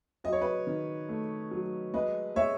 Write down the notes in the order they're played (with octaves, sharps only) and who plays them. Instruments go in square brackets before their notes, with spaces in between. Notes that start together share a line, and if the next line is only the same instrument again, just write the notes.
[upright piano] F#3 D#5
C#5
B4 D#5
D#3
A3
F#3
G#3 B4 D#5
G#3 C#5 E5